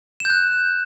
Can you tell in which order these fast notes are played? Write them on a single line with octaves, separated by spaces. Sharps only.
E7 G6 F#6